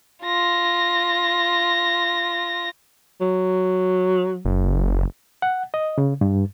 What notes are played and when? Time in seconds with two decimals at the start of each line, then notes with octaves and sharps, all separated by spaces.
0.23 F4 A#6
3.21 F#3
4.45 F#1
5.42 F#5
5.74 D#5
5.98 C#3
6.21 G2